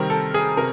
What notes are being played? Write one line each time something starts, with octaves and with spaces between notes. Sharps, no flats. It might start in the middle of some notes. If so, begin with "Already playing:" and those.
Already playing: C3 D#3 G3 C4 A#4
A4
G#4
C3 A#4